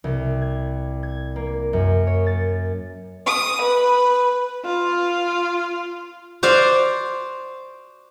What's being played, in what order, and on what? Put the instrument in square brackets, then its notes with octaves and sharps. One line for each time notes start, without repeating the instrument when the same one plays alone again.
[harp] C2
G#6
G#6
A#3
F#2
C#5
A6
[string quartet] D#6
B4
F4
[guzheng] F#4 C5 D5 F5